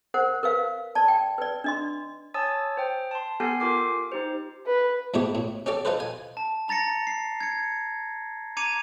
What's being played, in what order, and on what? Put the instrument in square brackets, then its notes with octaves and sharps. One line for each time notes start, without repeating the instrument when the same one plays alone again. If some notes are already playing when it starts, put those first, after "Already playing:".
[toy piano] A#4 C5 F#5
A#4 B4 F5
D5 A5
G5
B4 D5
D4 D#5 C6
[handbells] C#5 G#5 A5 D#6 E6 A6
C5 G5
A5 C6
B3 G4 A4 G#5 G6 C7
F4 A#4 D6 C7
D#4 G4 C5
[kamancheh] B4
[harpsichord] E2 G#2 A3 G4
A2
C#4 G4 A4 D5
D#4 F4 A4 B4 C5
G#5
[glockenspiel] A5
A5 A#5 A6 A#6 C#7
C7
G#6 C#7
A#5 D6 G#6 C#7 D#7 F7